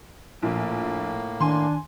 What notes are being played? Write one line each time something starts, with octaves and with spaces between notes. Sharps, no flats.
A#1 A2 A#3
D#3 D4 G#5 C6